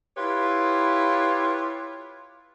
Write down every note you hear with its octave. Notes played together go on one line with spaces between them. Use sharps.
E4 F4 G4 B4 C#5